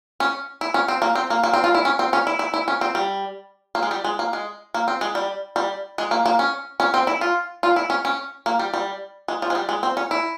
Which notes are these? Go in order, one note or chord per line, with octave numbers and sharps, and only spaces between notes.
C#4
E4
C#4
C4
A#3
C4
A#3
A#3
C4
F4
E4
C#4
C4
C#4
E4
E4
E4
C#4
C4
G3
A#3
G#3
G3
G#3
A#3
G#3
A#3
C4
G#3
G3
G3
G#3
A#3
A#3
C#4
C#4
C4
E4
F4
F4
E4
C#4
C#4
A#3
G3
G3
G#3
F3
G#3
G3
G#3
C4
C#4
E4